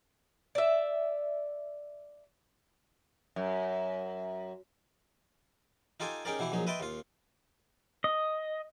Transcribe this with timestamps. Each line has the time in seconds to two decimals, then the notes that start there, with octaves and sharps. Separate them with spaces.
0.55 D5 E5
3.36 F#2
6.00 D#4 F4 G4 A4 G#5
6.25 C#4 D#4 G4 G#4 A#4 D5
6.39 B2 E3 E4 G4
6.52 A#1 F#3 D#4 G#4
6.67 B4 D#5 E5 G5 A5 C6
6.80 D#2 F4
8.04 D#5